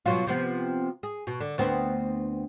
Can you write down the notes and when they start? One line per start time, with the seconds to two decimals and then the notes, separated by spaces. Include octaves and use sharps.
0.06 B2 F#3 F4
0.27 C3 F3 B3
1.03 G#4
1.27 B2
1.40 D3
1.58 D2 B3 C4